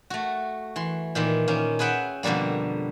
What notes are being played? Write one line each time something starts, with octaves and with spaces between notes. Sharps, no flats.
A3 F#4
E3 C6
A#2 D#3 E3
D#3 A#3 C#4
G#4 B4 E5 F#5 G5
F2 B2 D3 G3 A#3